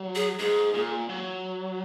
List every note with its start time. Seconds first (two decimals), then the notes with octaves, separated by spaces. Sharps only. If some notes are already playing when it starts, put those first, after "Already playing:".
Already playing: F#3
0.16 G#4
0.39 G#2 G#4
0.74 A#2
1.09 F#3